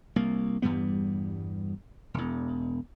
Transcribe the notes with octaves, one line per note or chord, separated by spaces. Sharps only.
C2 A#3
E2 G2 G3 B3
E1 E2